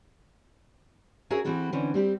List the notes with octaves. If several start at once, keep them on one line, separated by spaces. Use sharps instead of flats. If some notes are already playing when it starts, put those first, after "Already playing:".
C#4 F#4 G#4 A#4 C#5 E5
E3 C4 E4 F#4 A4
D3 E3 C4 C#4
G3 C4 G4